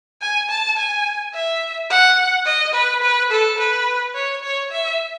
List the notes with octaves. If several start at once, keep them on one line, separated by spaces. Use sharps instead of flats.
G#5
A5
G#5
E5
F#5
D#5
B4
B4
A4
B4
C#5
C#5
E5